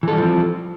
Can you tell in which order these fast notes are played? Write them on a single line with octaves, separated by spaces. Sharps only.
E3 A4 G3 F3 C4